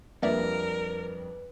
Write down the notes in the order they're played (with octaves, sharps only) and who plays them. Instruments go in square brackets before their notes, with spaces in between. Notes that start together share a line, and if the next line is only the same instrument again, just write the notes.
[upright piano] F2 G3 D4 [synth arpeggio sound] A#3 D5 E5 [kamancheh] A#4 [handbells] B4